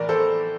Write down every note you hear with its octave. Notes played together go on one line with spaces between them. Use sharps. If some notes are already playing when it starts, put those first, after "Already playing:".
Already playing: A2 E3 A3 A#4 D5
A4 C5